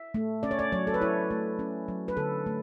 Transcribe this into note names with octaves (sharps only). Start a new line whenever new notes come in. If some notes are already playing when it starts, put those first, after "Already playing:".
Already playing: E5
A3
C#4 D5
C#5
D5
F#3 C#5
A4
B4
E4 C#5
A3
C#4
F#3
B4
D3 A4
A3